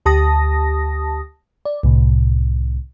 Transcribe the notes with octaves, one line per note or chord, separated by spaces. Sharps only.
D2 G4 A5 D#6 A#6
D5
C2 A2 C3